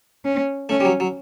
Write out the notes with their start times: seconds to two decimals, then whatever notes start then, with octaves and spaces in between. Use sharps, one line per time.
0.25 C#4
0.69 A3 C#4
0.80 G3
0.85 F#3
1.00 F#3